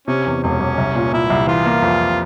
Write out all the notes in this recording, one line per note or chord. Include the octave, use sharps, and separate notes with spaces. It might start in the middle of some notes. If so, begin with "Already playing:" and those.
C3 C#4
E2
E1 C#4
E1
C2
A#2
A#2 E4
C2
E3 F4
A#3
F2